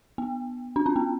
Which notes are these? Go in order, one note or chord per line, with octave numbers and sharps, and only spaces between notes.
B3
D4
C#4
B3